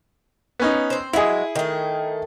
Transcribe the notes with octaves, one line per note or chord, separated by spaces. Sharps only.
B3 C#4 D#4
C4 C5
F#3 G#3 E4 G#4
D#3 A3